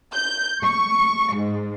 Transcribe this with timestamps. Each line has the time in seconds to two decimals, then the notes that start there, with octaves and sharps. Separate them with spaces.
0.12 G6
0.63 C#6
1.35 G#2